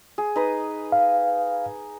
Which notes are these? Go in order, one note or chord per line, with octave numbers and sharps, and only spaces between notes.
G#4
D#4 B4 D#6
F5